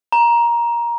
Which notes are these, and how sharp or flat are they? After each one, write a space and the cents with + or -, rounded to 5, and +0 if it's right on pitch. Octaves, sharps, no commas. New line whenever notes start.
A#5 +15